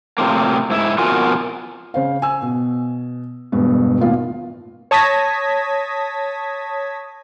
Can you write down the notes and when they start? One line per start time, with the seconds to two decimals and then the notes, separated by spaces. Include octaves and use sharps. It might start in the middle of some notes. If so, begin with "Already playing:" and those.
0.18 A2 C3 F3 A#3
0.70 G#2 E4
0.98 F2 B2 F4 F#4 A#4 G#5
1.94 C#3 C5 F5
2.22 G#5 E6
2.42 B2
3.52 E1 G2 B2
4.00 A1 D#2 B2 F4
4.91 C#5 A5 D#6 G#6 A#6 B6